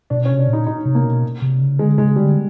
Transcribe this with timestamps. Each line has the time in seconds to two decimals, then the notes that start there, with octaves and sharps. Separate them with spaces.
0.10 B2 D4
0.25 C#4
0.30 C3
0.39 D4
0.48 A#2
0.53 D#4
0.67 D#4
0.85 C3
0.95 A#3
1.04 B2
1.42 C3
1.61 C#3
1.79 D3 G#3
1.98 C#3 G#3
2.16 D3 G3